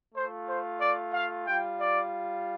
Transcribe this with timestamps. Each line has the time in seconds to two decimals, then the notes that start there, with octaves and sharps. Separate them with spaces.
0.14 A3 F4 C5
0.48 C5
0.80 D5
1.13 F5
1.47 G3 F4 G5
1.79 D5